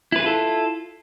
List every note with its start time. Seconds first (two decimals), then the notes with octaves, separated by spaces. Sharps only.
0.12 E4
0.16 B4
0.19 G#4
0.23 F4
0.26 A4